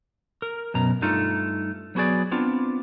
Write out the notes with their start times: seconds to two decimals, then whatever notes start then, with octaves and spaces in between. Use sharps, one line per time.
0.42 A#4
0.74 F#2 B2 A#5
1.02 G2 G3 A3 D#4 F4
1.95 F#3 B3 F#4 G#4 D5
2.31 B3 C4 D4 F4